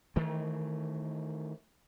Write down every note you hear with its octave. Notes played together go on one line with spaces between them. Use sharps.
D#3 E3 A3